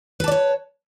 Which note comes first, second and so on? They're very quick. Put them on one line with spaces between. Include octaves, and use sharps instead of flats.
B4 A5 D5 C#5